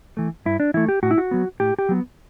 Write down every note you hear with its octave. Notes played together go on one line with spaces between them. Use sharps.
E3 A3
G2 E4
D4
E3 A3 E4
G4
A2 F#4
E4
F#4
F#3 B3
A2 G4
G4
F#3 B3